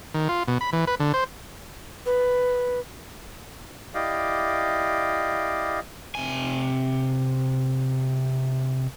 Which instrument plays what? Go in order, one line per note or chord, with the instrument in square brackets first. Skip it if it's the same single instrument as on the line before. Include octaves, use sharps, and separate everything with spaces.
[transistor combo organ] D#3
F4
B2
B5
E3
B4
D3
C5
[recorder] B4
[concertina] E4 G4 D5 D#5 F5
[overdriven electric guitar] C3 G#5